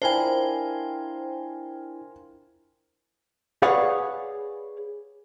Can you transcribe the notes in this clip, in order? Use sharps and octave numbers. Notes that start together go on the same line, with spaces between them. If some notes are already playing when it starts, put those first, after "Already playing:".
D4 E4 F4 A#4 C5 G5 G#5
G#4 B4 C#5 D5 F5 F#5